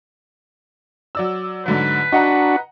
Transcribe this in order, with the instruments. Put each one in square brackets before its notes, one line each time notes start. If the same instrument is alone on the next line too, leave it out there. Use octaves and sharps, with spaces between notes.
[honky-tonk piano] F#3 D5 E6
[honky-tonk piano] G#2 D3 F#3 [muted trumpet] B4
[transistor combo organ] D4 F#4 [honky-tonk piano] D#5 F#5 A#5